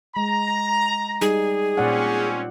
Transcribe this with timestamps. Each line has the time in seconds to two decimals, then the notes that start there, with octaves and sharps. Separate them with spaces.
0.16 G#3 A#5
1.21 G3 D#4 G#4
1.78 A#2 C4 C#4 D5 F#5